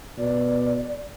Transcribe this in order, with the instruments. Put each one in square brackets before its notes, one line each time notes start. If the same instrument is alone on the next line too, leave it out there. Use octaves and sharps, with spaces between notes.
[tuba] B2 [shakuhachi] D5